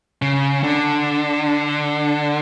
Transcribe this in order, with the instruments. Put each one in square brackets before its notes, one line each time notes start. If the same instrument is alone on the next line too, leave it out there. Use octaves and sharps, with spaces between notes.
[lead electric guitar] C#3
D3